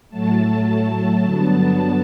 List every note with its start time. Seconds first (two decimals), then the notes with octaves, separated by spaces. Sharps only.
0.10 A2 F#3 A3 A5
1.23 G2 D3 F#3 B3 A5